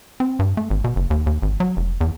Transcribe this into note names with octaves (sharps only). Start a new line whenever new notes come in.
C4
G2
A3
G#1
B2
F#1
D#2
D#2
G#1
F#3
F1
E2